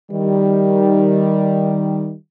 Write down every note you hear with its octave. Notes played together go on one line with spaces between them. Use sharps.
D#3 G3